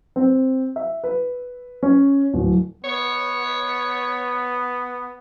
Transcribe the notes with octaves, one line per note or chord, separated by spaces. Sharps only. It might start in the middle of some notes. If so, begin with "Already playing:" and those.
C4
E5
B4
C#4
D1
B3 C#5